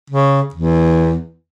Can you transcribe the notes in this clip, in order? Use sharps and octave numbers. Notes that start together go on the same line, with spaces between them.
C#3
E2